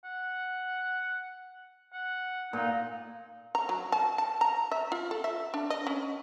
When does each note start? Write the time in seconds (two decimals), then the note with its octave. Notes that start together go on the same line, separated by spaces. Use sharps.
0.04 F#5
1.93 F#5
2.53 A#2 D#4
3.55 A#5
3.69 F#3
3.92 A5
4.18 A5
4.41 A#5
4.72 E5
4.92 F4
5.11 A4
5.24 E5
5.54 D4
5.70 D#5
5.87 C#4